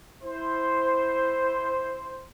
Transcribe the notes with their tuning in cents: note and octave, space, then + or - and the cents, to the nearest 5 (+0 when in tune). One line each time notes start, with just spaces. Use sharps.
E4 +0 C5 +0